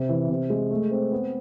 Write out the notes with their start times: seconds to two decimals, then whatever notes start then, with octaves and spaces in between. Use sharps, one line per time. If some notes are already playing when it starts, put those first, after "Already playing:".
Already playing: C3
0.09 E3
0.29 C3
0.50 G#3
0.71 A3
0.91 C4
1.12 B3